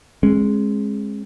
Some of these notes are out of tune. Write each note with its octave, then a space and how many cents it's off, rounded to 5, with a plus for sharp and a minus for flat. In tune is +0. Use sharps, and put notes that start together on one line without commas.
G#3 +0 C#4 -45